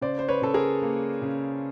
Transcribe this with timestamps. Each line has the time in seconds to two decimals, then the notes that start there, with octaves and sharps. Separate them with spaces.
0.01 C#3 C5 D5
0.19 C5
0.28 B4 C#5
0.42 C#3 A4
0.54 G#4 A#4
0.82 A#3
1.22 C#3